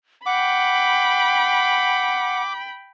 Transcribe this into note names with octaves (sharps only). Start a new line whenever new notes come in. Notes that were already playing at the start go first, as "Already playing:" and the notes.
F#5 G5 B5 D6